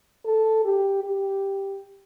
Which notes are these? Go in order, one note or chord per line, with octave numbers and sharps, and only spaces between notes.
A4
G4
G4